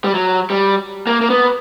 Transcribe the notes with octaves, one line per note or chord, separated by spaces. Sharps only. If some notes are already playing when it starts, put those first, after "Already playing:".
G3
F#3
G3
A#3
A#3
B3